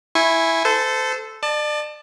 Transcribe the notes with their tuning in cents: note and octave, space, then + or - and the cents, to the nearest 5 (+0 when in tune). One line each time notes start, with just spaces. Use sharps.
E4 +0 G#5 +0 C#6 -30
A4 +0 C5 -30
D5 +35 A5 +0